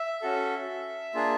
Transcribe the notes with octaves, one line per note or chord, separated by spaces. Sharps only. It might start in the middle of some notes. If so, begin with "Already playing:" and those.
Already playing: E5
C#4 F#4 A4
A#3 D4 F4 G#4